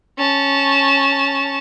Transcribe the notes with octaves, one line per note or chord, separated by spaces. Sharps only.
C#4 A5